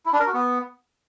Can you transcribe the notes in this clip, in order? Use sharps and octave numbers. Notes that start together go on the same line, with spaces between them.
E4
D4
A#4
F#4
B3